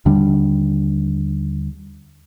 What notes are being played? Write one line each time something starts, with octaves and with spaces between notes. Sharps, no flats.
D#2 D3 G3 D4